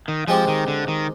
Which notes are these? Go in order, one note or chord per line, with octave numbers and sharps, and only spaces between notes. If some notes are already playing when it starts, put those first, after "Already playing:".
D#3
F3 G#3 C4 G4
D#3
D3
D#3